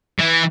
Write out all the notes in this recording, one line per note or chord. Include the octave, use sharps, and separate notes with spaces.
E3